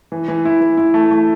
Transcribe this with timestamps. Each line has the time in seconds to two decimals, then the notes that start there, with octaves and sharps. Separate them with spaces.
0.12 E3
0.28 E3
0.45 E4
0.61 E3
0.77 E4
0.94 A3
1.11 A3